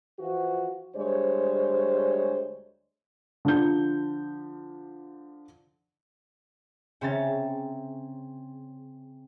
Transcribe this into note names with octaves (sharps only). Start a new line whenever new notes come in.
E3 F3 F#4
D2 G3 G#3 C5 C#5
D3 F3 D4 G6
C#3 C4 C#4 E5 A#5 A6